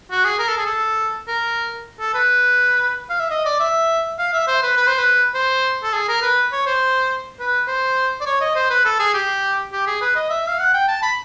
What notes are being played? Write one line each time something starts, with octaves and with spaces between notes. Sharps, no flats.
F#4
G#4
A#4
A4
G#4
A4
A#4
A4
B4
F5
E5
D#5
D5
E5
F5
E5
C5
B4
B4
C5
B4
C5
A4
G#4
A#4
B4
C#5
C5
B4
C5
D5
C#5
D#5
C5
B4
A4
G#4
G4
G4
G#4
B4
D#5
E5
F5
F#5
G5
A5
B5